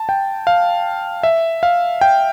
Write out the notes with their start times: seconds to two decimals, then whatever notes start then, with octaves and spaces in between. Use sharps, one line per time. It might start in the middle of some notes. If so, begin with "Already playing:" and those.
Already playing: A5
0.09 G5
0.47 F5
1.23 E5
1.63 F5
2.01 G5